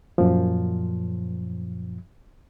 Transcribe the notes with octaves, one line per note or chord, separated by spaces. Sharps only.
F#2 A#2 F3